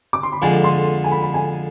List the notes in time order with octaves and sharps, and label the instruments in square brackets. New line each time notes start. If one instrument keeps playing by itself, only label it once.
[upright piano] D6
C6
B5
[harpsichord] F2 D3 G#3 [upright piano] G#5
[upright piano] C6
G#5
B5
B5
G#5